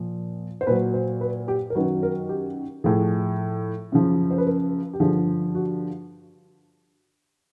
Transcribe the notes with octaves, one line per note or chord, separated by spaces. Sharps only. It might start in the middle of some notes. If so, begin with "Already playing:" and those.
Already playing: A#2 F3
C5
A#2 F#3 B4
C5
B4
G4
A#4
F#2 D#3 F#3 B4
A#4
G4
A2 F3 G#4
F#2 C#3 F3
C5
B4
A#4
G4
G2 D3 F3 G#4
F#4